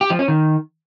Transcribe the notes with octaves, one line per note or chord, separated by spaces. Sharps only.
G4
F3
C#4
D#3